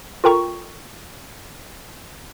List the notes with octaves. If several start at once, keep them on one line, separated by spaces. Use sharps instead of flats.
F4 A4 A#4 G5 A#5 C#6